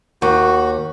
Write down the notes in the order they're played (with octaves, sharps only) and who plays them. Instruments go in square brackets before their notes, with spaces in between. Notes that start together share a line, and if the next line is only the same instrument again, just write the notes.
[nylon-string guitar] D#2 [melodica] F#4